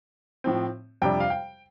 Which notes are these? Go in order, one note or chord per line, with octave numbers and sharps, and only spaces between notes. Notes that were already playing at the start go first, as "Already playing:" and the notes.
A2 F3 C4
F2 C3 G3 D4 G5
F5
G5